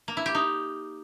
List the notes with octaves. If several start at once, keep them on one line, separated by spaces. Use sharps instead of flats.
A#3
E4
G4
D#4